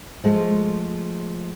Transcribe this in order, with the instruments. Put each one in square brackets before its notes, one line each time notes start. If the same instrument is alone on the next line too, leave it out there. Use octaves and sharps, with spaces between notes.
[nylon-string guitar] F3 G#3 A3